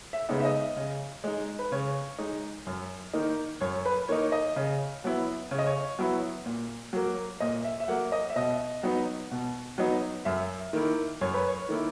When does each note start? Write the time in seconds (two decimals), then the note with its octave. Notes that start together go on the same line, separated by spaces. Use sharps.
0.13 E5
0.29 C#3 G#3 B3 D#4
0.40 E5
0.45 D#5
0.77 C#3
1.24 G#3 D#4
1.59 B4
1.72 C#3 C#5
2.19 G#3 D#4
2.67 F#2
3.13 D#3 A#3 D#4
3.61 F#2 C#5
3.85 B4
4.08 D#3 A#3 D#4 C#5
4.32 D#5
4.56 C#3
5.04 F#3 B3 E4
5.51 C#3 C#5
5.59 D#5
5.66 C#5
5.99 F#3 B3 E4
6.46 A#2
6.93 F#3 A#3
7.40 A#2 D#5
7.64 E5
7.80 E5
7.88 F#3 A#3 F#5
8.12 D#5
8.30 E5
8.36 B2 D#5
8.83 F#3 B3 D#4
9.31 B2
9.78 F#3 B3 D#4
10.25 F#2 E5
10.73 D#3 A#3 E4
11.21 F#2 C#5
11.34 B4
11.47 C#5
11.69 D#3 A#3 E4